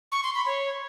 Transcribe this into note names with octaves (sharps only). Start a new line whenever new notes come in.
C#6
C6
B5
C#5